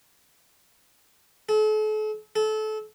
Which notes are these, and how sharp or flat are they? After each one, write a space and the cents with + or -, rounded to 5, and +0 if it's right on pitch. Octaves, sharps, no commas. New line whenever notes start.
A4 -40
A4 -25